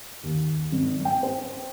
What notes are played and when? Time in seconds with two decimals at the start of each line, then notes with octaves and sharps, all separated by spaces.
0.23 D#2
0.72 G#1
1.05 G5
1.23 C5